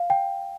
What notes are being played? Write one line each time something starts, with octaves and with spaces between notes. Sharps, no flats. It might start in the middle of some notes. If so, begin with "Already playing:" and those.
Already playing: F5
G5